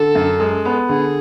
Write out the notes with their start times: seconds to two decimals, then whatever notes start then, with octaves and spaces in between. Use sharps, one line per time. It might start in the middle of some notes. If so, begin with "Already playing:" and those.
Already playing: D3 A4
0.15 F#2
0.40 G#3
0.65 B3
0.89 D3 G#4